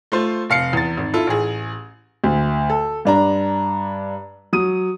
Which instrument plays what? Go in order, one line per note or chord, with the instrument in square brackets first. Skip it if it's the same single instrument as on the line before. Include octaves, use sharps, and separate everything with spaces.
[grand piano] A3 F4 C5
F1 F5 C7 C#7
E2 A6
G#1
E4 F4 A4
A1 G#4
D2
A4
G2 D4 A#5
F#3 D#6 D#7